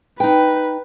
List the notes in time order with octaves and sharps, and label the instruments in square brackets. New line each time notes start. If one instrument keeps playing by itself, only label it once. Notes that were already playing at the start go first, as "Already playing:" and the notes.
[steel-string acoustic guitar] D#4 G5 [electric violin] B4